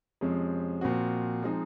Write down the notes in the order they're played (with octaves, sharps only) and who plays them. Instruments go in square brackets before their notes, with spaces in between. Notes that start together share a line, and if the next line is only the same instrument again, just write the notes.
[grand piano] F2 C3 F3 G#3 C#4
A#2 F3 C4 F#4
F3 G#3 C4 D#4